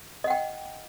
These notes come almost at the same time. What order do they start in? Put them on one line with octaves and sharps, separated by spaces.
D#5 F#5 G5